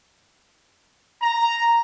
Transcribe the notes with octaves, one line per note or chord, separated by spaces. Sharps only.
A#5